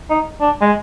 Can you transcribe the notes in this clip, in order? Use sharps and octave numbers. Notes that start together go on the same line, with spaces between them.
D#4
D4
G#3